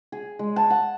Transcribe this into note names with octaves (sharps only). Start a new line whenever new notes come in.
G#4
G#3
A5
F#5